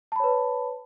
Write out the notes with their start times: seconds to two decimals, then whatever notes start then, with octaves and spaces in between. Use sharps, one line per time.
0.12 A5
0.16 B5
0.20 C#5
0.24 B4